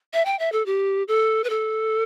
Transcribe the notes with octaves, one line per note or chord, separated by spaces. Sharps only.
E5
G5
E5
A4
G4
A4
B4
A4